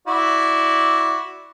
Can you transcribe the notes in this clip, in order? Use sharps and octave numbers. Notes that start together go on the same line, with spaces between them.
E4 F#4 D5